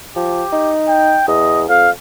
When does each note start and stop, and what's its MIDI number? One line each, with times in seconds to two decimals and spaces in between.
0.16 0.43 53
0.16 0.72 67
0.53 1.20 63
0.88 1.26 79
1.28 1.65 40
1.28 1.62 75
1.69 1.90 41
1.69 1.90 77